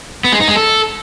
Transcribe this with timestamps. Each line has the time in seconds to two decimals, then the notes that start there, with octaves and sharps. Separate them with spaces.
0.24 B3
0.32 G#3
0.40 D#4
0.48 G#3
0.56 A4